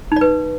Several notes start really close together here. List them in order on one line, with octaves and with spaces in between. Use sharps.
D#4 D5 B4